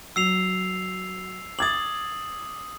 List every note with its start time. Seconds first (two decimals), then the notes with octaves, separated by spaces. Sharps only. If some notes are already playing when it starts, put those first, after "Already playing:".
0.16 F#3 E6 C7 F7
1.59 D6 D#6 G#6 A6 F#7